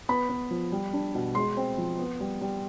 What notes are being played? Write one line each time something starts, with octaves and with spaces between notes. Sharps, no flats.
B3 B5
B3
F3
G3
D4
B2
G#3 C6
C4
F3
B3
G3
G3